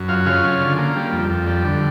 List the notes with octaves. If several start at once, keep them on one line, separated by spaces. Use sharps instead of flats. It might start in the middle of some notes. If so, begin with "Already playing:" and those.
Already playing: F#2
F#3 F4 F5
C#3 F4 F5
C#4
D3
A#3
G3
F2
F2
G3
D3